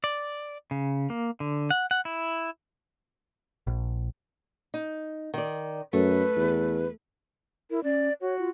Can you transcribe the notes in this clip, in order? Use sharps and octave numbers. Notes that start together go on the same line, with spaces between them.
D5
C#3
A#3
D3
F#5
F#5
E4
A#1
D#4
D#3 D5
F#2 A3 B4
E2
E4 A#4
C#4 D5
F#4 C#5
F4